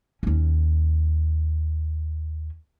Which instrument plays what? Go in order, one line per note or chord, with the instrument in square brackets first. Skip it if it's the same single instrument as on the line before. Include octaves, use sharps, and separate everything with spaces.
[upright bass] D#2 C#4